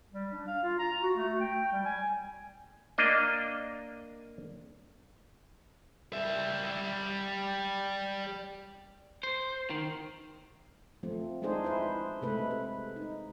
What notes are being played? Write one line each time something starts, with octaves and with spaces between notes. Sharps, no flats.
G3
D4
F5
F4
A#5
F#4
A3
G5
G3
G#5
A#3 D4 D#5
G3 E5
C5
D#3
F3 A3 C4
G#3 D4 D#4 G#4 C5
E4 B4 C5
C3 G#3 A3 B4
B4
D#4